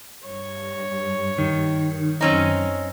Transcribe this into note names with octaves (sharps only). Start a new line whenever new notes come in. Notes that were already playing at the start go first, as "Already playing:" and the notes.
G2 C#5
D#3
F#2 C4 C#4 D#4